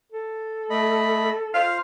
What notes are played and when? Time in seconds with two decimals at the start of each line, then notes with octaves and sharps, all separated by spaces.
0.12 A4
0.70 A3 D#5 B5
1.54 F4 C5 F5 F6